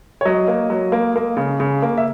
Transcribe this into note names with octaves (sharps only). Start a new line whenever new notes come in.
C#5
F#3 D#5
A#3
F#3
A#3
A#3
C#3
C#3
A#3
E5